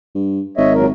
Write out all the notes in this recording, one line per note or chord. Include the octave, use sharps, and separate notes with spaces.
G2
G#1 C#5 D#5 E5
A#2 F#3 A#4